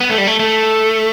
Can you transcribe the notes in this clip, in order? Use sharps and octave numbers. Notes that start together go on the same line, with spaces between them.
B3
A3
G3
A3
A3